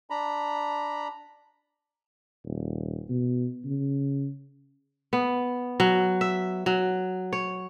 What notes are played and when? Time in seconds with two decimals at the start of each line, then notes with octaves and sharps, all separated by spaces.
0.10 D4 A#5 B5
2.44 D#1
3.09 B2
3.65 C#3
5.13 B3
5.80 F#3
6.21 E5
6.66 F#3
7.33 C#5